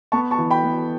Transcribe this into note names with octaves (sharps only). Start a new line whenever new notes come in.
B3 A5 C#6
A5 C#6
E3
G5 B5
B3